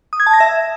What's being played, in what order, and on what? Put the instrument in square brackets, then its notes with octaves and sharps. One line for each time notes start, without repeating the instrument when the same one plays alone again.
[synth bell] D#6
G#6
A5
A#6
E5